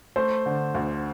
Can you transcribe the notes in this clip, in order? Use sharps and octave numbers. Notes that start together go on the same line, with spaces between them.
A3 C5
D3
D2